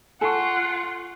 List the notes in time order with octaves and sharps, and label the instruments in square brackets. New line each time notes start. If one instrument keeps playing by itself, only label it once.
[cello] F4 [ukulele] A4 [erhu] F#5 [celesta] G#5 C#6